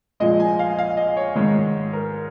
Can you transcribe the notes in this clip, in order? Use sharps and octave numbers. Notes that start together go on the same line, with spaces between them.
A#2 F3 G#3 D#5
G#5
F5
F5
D#5
C#5
G#2 D#3 G#3
A#4